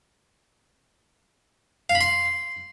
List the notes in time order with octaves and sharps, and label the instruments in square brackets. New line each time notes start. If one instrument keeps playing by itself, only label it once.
[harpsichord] F5
B5
C6